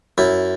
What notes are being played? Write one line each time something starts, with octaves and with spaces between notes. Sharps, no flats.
F#2 E4